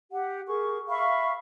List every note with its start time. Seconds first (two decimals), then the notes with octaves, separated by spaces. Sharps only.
0.12 G4 F#5
0.47 G#4 A#4 C#6
0.89 E5 F5 B5 C#6